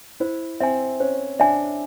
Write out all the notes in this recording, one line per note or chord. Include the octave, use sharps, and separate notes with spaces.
E4 C5
C4 E5 G#5
C#4 C5
D4 E5 G#5